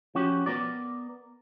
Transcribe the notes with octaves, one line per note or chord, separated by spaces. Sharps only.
F3 C#4 F#4 G4
B3 A#4 D5